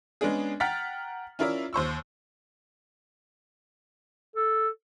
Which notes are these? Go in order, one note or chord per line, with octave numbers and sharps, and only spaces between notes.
G#3 B3 C#4 D4 G#4
F#5 G5 A#5 F6 A6 B6
C#4 E4 F4 A#4 D5 E5
D#2 C5 C#6 E6
A4